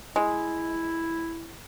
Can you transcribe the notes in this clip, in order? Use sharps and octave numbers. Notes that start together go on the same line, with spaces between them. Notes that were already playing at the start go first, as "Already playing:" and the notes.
G#3 E4